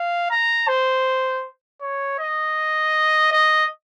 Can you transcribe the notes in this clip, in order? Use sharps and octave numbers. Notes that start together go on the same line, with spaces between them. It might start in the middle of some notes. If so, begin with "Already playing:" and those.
Already playing: F5
A#5
C5
C#5
D#5
D#5